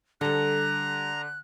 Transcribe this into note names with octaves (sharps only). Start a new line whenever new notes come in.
D3 G3 A4 A#5 F#6